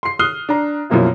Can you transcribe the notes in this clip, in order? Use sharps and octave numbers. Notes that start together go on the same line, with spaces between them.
C6 C7
D#6 F6 F#6 C7 G7
D4 A#5
F#2 B2 F3 A#3 E4 F4